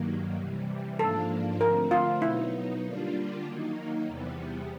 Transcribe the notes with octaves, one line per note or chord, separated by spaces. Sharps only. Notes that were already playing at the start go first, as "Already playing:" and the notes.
Already playing: G2 D#3 F#3 A#3
C3 E3 G3
G#2 F3 A#3 D4 F4 A4
D3 F3 A3 C4 A#4
F4
B2 F#3 B3 D#4 E4
D3 G3 A#3 D4 F4
D#3 F#3 A#3 D#4
E2 C3 E3 G3 B3